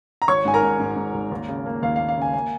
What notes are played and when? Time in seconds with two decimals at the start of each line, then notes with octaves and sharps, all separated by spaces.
0.22 A#5
0.28 G#1 C#5 C#6
0.45 G#2 G#5
0.54 A#4 A#5
0.63 G#2
0.79 G#2
0.96 G#2
1.14 G#1
1.31 D#2
1.48 C#3
1.66 A#3
1.82 D#2 F5
1.96 A#3 F5
2.08 F5
2.17 C#3 G#5
2.34 A#3 G#5